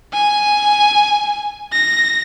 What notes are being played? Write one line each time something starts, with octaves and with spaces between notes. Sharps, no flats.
G#5
A#6